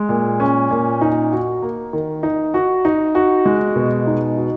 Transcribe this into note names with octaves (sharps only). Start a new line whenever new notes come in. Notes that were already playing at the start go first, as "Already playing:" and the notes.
Already playing: G#3
A#2
C#4
A#2
D#4
F#4
A#3
D#3
D#4
F#4
D#4
F#4
G#3
B2
D#4
F#4